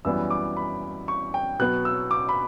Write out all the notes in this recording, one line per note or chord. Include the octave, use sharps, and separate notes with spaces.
F#2 E3 G3 B3 E6
D6
B5
C#6
G5
B2 F#3 B3 F#6
E6
D6
B5